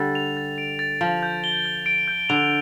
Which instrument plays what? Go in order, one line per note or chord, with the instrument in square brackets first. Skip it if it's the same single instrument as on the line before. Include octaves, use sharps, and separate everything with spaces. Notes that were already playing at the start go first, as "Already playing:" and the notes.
Already playing: [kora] D3 G3 [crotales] A6
[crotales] F7
A6
D7
A6
[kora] F3 [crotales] D7
[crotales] G6
G7
G6
D7
G6
[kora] D3 [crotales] F7